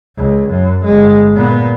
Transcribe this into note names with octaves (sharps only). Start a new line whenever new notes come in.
C#2
F#2
G1 G#3
A#2 B3